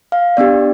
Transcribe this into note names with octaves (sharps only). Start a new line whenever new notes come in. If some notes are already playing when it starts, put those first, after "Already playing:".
F5
B3 D4 G4 D5